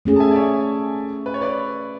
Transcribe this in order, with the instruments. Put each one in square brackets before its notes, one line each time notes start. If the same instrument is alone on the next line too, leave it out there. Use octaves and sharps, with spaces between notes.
[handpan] A3 C#4 G#4
[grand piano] A5
E5 G#5
D5
C#5 E5
B4
C#5
B4 D5